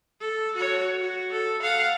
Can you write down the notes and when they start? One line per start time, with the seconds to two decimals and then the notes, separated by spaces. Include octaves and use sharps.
0.20 A4
0.56 F#4 C#5
1.01 F#4
1.32 A4
1.62 F5 F#5